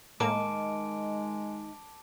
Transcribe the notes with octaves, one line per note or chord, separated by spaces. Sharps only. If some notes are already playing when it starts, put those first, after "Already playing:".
A2 D#3 G#3 A#3 D#4 A5 D6 D7